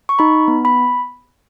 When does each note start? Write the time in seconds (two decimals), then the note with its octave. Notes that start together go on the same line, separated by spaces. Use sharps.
0.09 C#6
0.19 D#4 B5
0.48 B3
0.65 B5